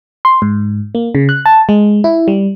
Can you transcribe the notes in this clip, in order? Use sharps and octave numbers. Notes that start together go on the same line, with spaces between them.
C6
G#2
A#3
C#3
F#6
A5
G#3
E4
G3